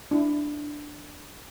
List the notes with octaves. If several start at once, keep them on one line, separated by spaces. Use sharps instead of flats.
D4 E4